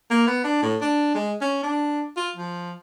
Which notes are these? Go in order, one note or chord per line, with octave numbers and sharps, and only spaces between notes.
A#3
B3
D4
A2
D4
G#3
C#4
D4
F4
F3